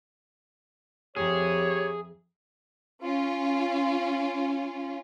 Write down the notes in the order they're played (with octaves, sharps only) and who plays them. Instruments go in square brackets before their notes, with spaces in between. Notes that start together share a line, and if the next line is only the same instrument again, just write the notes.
[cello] F2 E5 [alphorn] G4 [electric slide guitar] G#4 [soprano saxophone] C#5
[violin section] C#4 F4